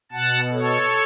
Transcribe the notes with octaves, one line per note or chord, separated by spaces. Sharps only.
B2 F#5 A5
A4 C#5